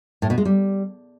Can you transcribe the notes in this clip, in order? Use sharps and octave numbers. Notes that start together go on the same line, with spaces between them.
A2
B2
G#3
G3